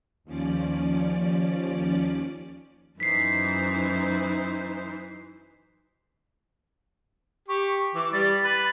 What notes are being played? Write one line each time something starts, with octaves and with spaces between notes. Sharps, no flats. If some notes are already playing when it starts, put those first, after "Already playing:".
D#2 F3 C#4 D5
F#2 E3 D#4 C5 B6 C7
G4 C#6
E3 D6
G3 A6
B4